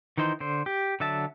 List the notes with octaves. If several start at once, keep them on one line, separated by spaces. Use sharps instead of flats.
D#3 E3 D#4 C5
D3 C5
G4
D3 F#3 E5 A5